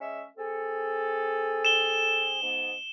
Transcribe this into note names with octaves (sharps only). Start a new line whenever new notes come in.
G#3 C#4 E5
C4 G#4 A4
E7 G7
G#2 B3